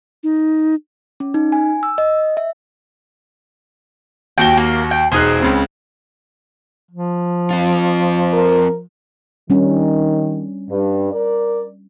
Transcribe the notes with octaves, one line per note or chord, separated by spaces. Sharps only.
D#4
C#4
D#4
G#5
E6
D#5
E5
D#2 F#4 G5 G7
A#3
G5
E1 D#4 G#4 A#4 C5 F#6
C#2 C#3 C4
F3
C4 F4
A#4
D#3 G3 C#4 D4
G2
A#4 D5